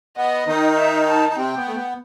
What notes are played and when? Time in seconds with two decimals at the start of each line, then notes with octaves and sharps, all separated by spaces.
0.17 B3 D#5
0.48 D#3 D#4
0.77 E5
1.07 A5
1.29 D#4
1.37 C3 C4 G5
1.56 B3
1.67 A3
1.76 B3